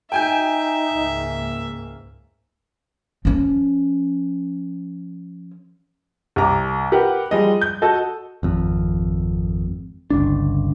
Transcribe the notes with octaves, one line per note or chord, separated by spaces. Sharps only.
D#4 E5 G5 G#5 G6
C#2 G#2 A#3
F3 C#4
C2 A#5 D6
G4 A#4 B4 F#5
F3 G3 G#3 D#5
G6
F#4 A4 D#5
G#1 F2
G1 C#2 D4